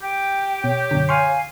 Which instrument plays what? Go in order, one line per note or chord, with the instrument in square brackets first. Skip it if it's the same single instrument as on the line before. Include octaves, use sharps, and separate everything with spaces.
[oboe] G4 [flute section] G5
[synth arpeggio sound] B2 [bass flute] C#5
[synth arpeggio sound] F#2 B2 D3
[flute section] F5 G#5 [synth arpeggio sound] C6 C#6 F6